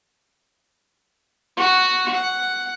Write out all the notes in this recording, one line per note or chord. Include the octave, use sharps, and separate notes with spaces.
F#4 F#5
F#5